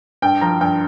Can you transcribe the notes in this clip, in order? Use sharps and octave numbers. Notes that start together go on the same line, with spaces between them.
G2 G5
F3 A#5
G2 G5